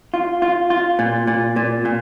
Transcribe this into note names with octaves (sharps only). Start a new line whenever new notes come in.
F4
F4
F4
A#2
A#2
A#2
A#2